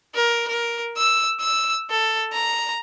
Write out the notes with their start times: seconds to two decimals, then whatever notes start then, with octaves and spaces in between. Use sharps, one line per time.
0.15 A#4
0.48 A#4
0.98 E6
1.40 E6
1.90 A4
2.33 A#5